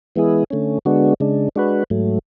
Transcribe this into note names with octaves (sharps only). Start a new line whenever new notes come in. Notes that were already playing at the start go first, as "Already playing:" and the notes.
E3 G#3 B3 E4 G#4
D3 A3 C#4
D3 G#3 B3 D4 F#4
C#3 G#3 D4
G#3 D4 F#4 B4
G#2 F#3 A3